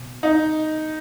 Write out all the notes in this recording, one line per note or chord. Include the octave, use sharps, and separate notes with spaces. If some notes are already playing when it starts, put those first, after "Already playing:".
Already playing: B2
D#4